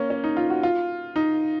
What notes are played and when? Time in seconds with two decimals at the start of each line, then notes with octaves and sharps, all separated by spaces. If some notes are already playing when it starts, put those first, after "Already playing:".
Already playing: A#3 C#4
0.10 C#4
0.24 D#4
0.37 F4
0.50 F#4
0.63 F4
1.16 D#4